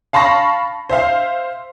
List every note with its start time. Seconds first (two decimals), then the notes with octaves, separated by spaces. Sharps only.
0.13 F5 A5 B5 C#6 A#6
0.89 C5 E5 F5